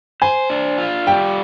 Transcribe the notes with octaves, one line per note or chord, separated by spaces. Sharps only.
C5 G#5
D4
F4
G3 G5